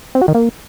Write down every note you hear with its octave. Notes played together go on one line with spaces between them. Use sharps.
C4
F#4
D#3
A#3